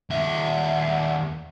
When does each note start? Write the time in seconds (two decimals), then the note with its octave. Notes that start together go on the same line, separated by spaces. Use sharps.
0.10 D#2 E5